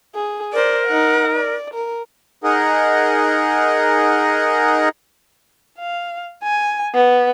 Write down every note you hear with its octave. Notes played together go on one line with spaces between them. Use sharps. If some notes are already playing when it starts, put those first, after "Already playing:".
G#4
A#4 C5 D5
D#4 F#5
D5
A#4
D#4 G#4 A#4 D#5 F#5
F5
G#5
B3